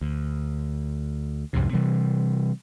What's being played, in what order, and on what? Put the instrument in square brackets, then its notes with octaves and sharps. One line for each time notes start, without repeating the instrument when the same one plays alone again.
[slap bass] D2
C2 F2 G#2 C3
C3 E3 G3